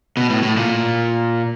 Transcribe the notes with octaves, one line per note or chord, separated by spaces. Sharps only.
B2
A2
A2
A#2